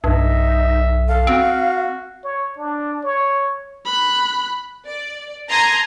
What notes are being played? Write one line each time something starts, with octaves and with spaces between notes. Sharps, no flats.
B1 G2 D#4 E5
A4 F5
C4 F#4
C#5
D4
C#5
B5 F#6
D5
A5 A#5 C6 D#6 G#6